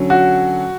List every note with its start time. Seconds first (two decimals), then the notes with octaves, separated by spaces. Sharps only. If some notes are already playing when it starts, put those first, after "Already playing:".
Already playing: D3 F#3 C#4
0.10 F#4